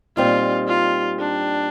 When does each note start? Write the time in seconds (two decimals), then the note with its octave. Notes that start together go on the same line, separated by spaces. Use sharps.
0.17 A#2 G3 C4 D#4 F4
0.68 F4
1.20 D4